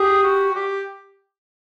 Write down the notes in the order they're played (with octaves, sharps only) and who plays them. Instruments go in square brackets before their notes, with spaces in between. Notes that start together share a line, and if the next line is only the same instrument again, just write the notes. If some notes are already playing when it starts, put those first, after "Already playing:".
Already playing: [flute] G4 [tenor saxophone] G#4
[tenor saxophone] F#4
G4